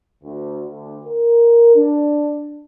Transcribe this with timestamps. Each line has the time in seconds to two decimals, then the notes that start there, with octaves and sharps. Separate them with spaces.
0.23 D2
0.69 D2
1.07 A#4
1.75 D4